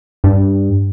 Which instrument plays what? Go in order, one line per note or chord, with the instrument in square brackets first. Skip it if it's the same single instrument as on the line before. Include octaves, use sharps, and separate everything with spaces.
[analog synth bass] G2